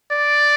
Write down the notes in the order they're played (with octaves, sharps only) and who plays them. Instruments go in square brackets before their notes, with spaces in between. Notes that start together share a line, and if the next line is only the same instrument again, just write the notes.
[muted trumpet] D5